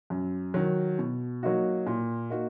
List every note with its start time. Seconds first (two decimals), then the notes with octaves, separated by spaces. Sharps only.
0.10 F#2
0.54 D#3 F#3
0.99 B2
1.43 F#3 A#3 D#4 F#4
1.87 A#2
2.30 A#3 D#4 F#4